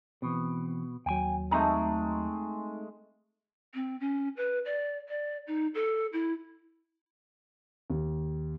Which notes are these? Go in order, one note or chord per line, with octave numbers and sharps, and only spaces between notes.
B2 E3 C4
D#2 F#3 G5 G#5
G#3 A3 C4 D#4 A#5
C4
C#4
B4
D5
D5
D#4
A4
E4
D#2